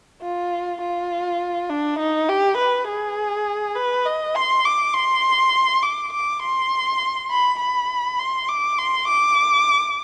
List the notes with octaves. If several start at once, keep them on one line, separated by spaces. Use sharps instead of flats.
F4
F4
D4
D#4
G4
B4
G#4
B4
D#5
C6
D6
C6
D6
D6
C6
B5
B5
C6
D6
C6
D6